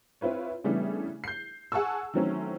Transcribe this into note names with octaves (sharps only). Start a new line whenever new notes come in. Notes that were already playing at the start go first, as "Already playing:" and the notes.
C4 E4 F4 B4 C#5
C#3 E3 G3 A3 B3 D4
G6 C7
G#4 F#5 G#5 A5 C#6 E6
D#3 E3 F#3 A3 C4 C#4